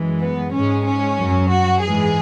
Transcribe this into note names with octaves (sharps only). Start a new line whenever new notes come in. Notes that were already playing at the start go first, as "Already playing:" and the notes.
Already playing: F#2 E3 G#3
B3
G#2 G#3 C#4
C#4
F#2 F#3
F#4
G#2 E3 G#3 G#4